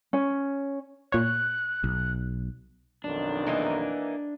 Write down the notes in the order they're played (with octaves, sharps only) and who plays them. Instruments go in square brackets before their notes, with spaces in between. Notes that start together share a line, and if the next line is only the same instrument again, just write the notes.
[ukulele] C#4
[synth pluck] A#2 C#5 [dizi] F#6
[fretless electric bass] B1
[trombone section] B1 F2 D#3 [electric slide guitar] D4
[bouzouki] E3 A#3 D#4